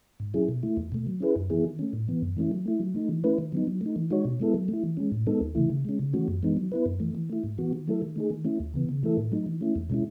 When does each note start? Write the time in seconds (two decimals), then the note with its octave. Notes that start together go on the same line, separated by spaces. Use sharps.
0.20 G#2
0.34 F#3 C#4 E4 G#4
0.49 B2
0.63 A3 E4
0.77 E2
0.92 B2 A3
1.07 F#3
1.20 C#4 E4 G#4 B4
1.36 F#2
1.50 E3 B3 E4 G#4
1.64 D#3
1.79 A3 C#4
1.93 A2
2.08 E3 B3
2.22 F#2
2.37 E3 A3 C#4 E4
2.51 F#3
2.66 A3 E4
2.80 F#3
2.95 A3 D#4
3.09 E3
3.24 A3 C#4 E4 B4
3.38 D#3
3.52 F#3 B3 D#4
3.67 F#3
3.81 A3 D#4
3.96 E3
4.11 G#3 D#4 F#4 C#5
4.25 B2
4.40 G#3 B3 E4 A4
4.54 F#3
4.68 A3 E4
4.83 E3
4.97 G#3 C#4
5.12 A2
5.27 G#3 B3 D#4 A4
5.41 D#2
5.55 C#3 E3 A3 E4
5.70 C#3
5.85 G#3 C#4
5.99 C#3
6.13 E3 A3 C#4 F#4
6.28 F#2
6.43 E3 G#3 B3 D#4
6.57 F#3
6.72 B3 E4 B4
6.86 F#2
7.00 E3 A3
7.15 E3
7.30 A3 E4
7.43 G#2
7.58 E3 B3 F#4
7.73 D#3
7.88 F#3 A3 E4 A4
8.02 D#3
8.16 A3 D#4 G#4
8.30 D#3
8.45 A3 C#4 E4
8.60 D#2
8.74 C#3 E3 B3
8.89 C#3
9.03 E3 A3 E4 A4
9.17 A2
9.32 F#3 A3 D#4
9.46 E3
9.61 A3 C#4 E4
9.76 E2
9.90 B2 G#3 C#4 E4